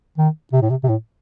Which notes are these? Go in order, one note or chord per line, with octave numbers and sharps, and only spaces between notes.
D#3
C3
A2
C3
C3
A2